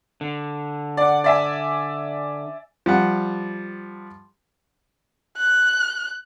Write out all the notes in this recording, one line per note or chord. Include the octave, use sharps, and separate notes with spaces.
D3
D5 F#5
D5 E5 G#5
F3 G3 F#5
F#6